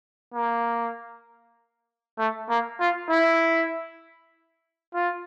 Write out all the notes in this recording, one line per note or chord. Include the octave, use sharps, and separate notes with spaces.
A#3
A3
A#3
F4
E4
F4